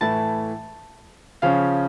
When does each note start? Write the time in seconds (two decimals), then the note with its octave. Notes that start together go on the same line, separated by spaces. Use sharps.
0.01 A2 E3 A3 E4 A5
1.42 C#3 F3 C#4 F5